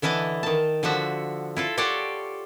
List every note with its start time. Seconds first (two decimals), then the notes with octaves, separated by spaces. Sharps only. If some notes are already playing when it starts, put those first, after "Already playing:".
0.02 D3 E3 E4 D#5 A5
0.43 D#3 A5
0.83 D3 F3 F#4 E5 F#5
1.56 E4 F4 A4
1.77 F4 G4 A4 C#5 D5 F#5